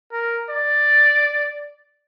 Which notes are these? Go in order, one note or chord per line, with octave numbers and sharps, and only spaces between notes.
A#4
D5